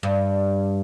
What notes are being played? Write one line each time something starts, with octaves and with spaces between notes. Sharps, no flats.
G2